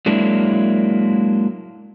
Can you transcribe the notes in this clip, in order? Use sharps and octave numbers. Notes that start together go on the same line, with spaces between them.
F#3 G#3 A#3 D4 E4